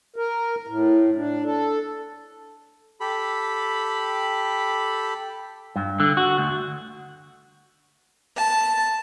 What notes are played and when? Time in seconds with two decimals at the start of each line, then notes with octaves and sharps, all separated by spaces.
0.16 A#4
0.68 A2
1.16 D4
1.44 A4
3.00 G4 A4 B5
5.76 G2
6.00 D3
6.17 F#4
6.38 D2
8.38 A5